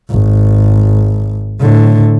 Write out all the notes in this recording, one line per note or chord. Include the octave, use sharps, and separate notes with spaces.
G#1
A2 D3